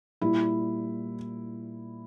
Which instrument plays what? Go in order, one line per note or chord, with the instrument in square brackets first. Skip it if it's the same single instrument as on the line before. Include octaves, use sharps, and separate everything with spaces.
[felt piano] A#2 G3 E4